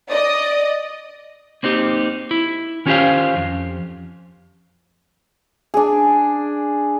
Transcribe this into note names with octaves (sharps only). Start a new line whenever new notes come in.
D5 D#5 D#6
A#3 C4 D#4 G4
E4
D#3 C#4 F4 G4 C5 F5
F2
D4 G#4